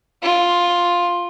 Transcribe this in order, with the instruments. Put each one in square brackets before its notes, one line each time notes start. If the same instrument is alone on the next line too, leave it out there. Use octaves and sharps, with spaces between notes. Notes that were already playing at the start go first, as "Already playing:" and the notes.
[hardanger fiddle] F4